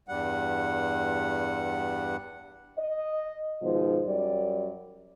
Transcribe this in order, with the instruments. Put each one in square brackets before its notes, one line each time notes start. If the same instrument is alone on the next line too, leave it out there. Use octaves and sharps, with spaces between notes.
[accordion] E2 G2 G3 F#5
[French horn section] D#5
G#2 B2 D#3 F3
F#2 G3 D5